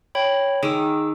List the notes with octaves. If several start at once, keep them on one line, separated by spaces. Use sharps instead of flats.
C#5 G5 B5
D#3 G#4 D6 E6